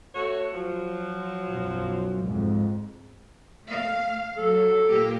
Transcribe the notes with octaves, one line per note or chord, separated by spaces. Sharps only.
A3 F#4 C#5
F3 F#3
B1 F#2
F2 G#2
A3 F5
F#3 A4
A#2 A#3 G4